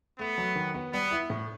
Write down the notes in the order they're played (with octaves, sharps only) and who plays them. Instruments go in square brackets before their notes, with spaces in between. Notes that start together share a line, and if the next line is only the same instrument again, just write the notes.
[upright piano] A3 [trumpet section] B3
[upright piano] F#3
D#3
B3
[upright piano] G3 [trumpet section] B3
[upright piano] E4
A2